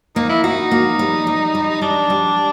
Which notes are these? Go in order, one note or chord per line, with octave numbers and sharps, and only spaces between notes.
A#3 D#4
E4
D#4 F#4
A#3
G3
G3
G3
G3 D4
G3